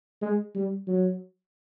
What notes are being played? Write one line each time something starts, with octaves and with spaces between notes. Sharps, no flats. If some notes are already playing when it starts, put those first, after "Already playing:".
G#3
G3
F#3